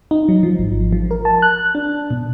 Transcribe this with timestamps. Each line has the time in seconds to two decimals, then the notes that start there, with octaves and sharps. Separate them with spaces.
0.11 D#4
0.29 F#3
0.43 F3
0.59 G#1
0.92 F3
1.11 A#4
1.25 A5
1.42 F#6
1.75 D4
2.11 B2